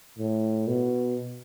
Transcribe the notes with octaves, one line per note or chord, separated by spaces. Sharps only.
A2
B2